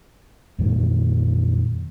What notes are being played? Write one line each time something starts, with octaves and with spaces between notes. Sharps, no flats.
F2 A#2 D#3 G3